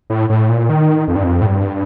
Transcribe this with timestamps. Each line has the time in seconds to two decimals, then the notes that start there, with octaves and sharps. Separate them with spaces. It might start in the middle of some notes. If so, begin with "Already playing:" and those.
0.10 A2
0.30 A2
0.49 A#2
0.69 D#3
1.08 F2
1.16 G2
1.24 F2
1.41 A2
1.46 G2